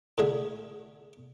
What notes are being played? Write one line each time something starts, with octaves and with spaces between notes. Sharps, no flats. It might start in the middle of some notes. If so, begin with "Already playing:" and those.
A2 D3 G#4 E5